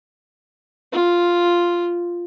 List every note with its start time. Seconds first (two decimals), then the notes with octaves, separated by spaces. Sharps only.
0.93 F4